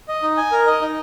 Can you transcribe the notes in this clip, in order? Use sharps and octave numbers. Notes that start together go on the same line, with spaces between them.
D#5
D#4
G#5
A#4
D#5
D#4